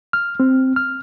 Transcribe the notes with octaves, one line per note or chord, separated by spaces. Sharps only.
F6
C4
F6